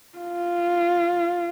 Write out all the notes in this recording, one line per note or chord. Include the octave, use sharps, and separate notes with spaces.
F4